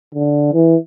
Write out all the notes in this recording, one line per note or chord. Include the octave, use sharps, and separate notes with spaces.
D3
E3